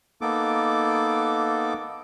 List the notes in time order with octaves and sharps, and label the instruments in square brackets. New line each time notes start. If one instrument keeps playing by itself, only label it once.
[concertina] A#3 B3 D#4 A4 D6